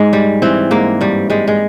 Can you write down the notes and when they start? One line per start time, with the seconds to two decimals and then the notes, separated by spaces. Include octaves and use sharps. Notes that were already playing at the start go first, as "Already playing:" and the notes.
Already playing: G#2 G#3
0.13 G3
0.42 E3 C4
0.71 G#2 A#3
1.01 G2 G3
1.30 G3 G#3
1.48 G#3